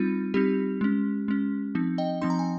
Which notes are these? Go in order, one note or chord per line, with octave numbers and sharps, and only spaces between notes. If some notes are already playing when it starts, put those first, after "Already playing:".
Already playing: G3 C4 D#4 F4
G3 C4 D#4 G4
G#3 C#4
G#3 C#4
F3 C4 D#4
D#5 G5
F3 C4 D#4 C6
A#5
G#5